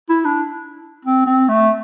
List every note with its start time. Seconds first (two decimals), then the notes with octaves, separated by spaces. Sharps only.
0.09 E4
0.26 D4
1.05 C4
1.26 C4
1.48 A3